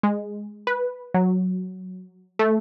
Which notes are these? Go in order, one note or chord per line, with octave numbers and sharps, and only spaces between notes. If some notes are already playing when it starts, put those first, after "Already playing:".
G#3
B4
F#3
A3